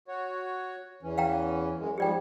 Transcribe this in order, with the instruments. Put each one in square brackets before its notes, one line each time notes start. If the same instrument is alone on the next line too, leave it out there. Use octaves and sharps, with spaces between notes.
[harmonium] F#4 C#5
E2 E3 C#4
[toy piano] F5 G5 A#5
[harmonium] F#2 G#3
[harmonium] G#2 F3 G3 [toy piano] G4 D5 G5